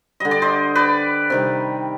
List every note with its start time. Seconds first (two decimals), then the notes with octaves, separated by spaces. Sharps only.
0.20 D3 G3 D#5
0.31 D5
0.42 C5 D#5
0.75 B4 D5
1.30 C3 D#3 G3